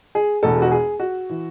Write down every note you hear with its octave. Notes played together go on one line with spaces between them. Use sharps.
G#4
E1 E2 B2 A4
F#4
G#4
F#4
E3